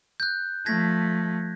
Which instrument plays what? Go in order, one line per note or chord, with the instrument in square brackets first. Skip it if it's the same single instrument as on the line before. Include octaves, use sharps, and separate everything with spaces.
[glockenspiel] F#6 G6
[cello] F3 A3 [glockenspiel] G#6 A#6 B6